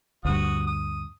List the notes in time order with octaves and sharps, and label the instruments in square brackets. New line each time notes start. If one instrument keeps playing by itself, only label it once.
[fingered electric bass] D2 G2 [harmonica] F#4 D#6
[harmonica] D#6